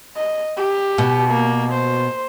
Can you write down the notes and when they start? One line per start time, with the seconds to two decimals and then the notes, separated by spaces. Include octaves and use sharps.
0.16 D#5
0.57 G4
0.98 B2
1.30 A#3
1.73 C5